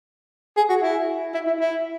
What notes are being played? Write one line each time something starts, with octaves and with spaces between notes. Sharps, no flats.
G#4
F#4
E4
E4
E4
E4